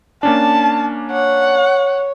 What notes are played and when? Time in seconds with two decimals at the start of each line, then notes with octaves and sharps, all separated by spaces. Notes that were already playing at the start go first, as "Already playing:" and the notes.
0.23 A#3 C#4 D4 A5
1.12 C#5 F#5